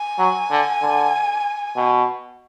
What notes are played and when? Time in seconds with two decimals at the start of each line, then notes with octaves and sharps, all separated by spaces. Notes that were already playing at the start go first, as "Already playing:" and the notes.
Already playing: G#5
0.19 F#3
0.50 D3
0.82 D3
1.76 B2